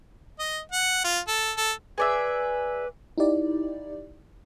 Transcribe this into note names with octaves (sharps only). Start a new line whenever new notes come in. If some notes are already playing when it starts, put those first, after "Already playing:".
D#5
F#5
F4
A4
A4
G#4 B4 D5 E5
D#4 E4 G4 D5